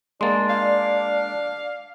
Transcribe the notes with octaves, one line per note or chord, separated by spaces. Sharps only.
G#3 A#3 D4 C6 A6
D5 F5